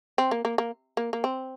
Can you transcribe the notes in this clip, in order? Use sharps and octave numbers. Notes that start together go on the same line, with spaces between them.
C4
A#3
A#3
A#3
A#3
A#3
C4